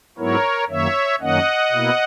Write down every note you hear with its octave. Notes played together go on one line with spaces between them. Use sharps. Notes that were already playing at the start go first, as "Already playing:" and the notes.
G#2 F#3 B3 E4 A#4 C#5
F#2 D#3 A#3 C#5 E5
F#2 D#3 A#3 C#4 D#5 F#5
B2 A#3 E4